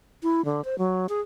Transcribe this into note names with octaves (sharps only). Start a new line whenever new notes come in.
E4
D3
C5
F#3
G#4